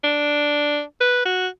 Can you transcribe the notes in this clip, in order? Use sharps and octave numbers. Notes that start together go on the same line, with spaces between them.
D4
B4
F#4